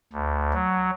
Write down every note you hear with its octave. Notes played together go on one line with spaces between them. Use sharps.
D2
F#3